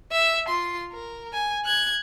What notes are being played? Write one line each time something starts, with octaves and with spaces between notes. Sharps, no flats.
E5
F4 C6
A#4
G#5
F#6 G#6